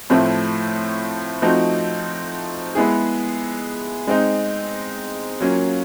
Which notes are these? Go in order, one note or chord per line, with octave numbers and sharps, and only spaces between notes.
A2 F3 A3 C4 E4
F3 A3 C4 D#4 F#4
G#3 B3 E4 G#4
G#3 C4 D#4
F#3 A#3 C#4 F4